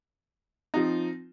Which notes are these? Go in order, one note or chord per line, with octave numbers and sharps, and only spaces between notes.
F3 C4 D#4